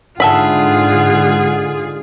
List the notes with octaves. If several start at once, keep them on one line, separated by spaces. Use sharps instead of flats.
G#2 D3 F4 G#4 A4 E5 F#5 B5